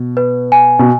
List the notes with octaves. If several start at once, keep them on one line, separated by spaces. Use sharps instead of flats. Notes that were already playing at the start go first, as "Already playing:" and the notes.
Already playing: B2
B4
G#5
B2